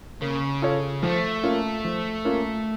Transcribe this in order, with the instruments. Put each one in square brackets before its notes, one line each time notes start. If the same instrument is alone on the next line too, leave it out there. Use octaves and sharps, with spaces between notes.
[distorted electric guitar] C#3 [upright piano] A#3
[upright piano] F4 A4 C#5
[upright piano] F3 [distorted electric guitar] A3
[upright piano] A#3 C#4 F4
F3
A#3 C#4 F4